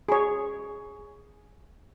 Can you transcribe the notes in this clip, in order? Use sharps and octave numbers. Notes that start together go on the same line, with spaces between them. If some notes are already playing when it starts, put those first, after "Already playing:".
G#4 C#5